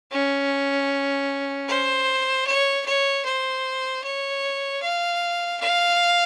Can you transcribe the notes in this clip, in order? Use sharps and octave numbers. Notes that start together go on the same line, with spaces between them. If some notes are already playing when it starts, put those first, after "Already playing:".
C#4
C5
C#5
C#5
C5
C#5
F5
F5